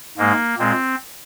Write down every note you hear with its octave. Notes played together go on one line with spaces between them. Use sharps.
G#2 G#3 A#3
A#2 G#3 C4